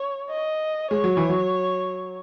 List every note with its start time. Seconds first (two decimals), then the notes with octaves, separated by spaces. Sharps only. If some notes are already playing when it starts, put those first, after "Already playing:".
Already playing: C#5
0.30 D#5
0.91 G#3 C#5
1.04 F#3
1.17 E3
1.29 F#3